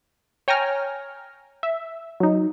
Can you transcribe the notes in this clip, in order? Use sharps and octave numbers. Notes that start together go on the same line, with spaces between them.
C#5 G5 G#5 A#5 F6
E5
F#3 D#4